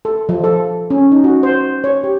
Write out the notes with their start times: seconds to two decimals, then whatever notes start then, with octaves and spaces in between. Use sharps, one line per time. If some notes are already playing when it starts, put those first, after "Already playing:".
0.05 A4
0.29 F3
0.44 A4
0.90 C#4
1.12 D#4
1.24 F#4
1.43 C5
1.84 C#5
2.04 G4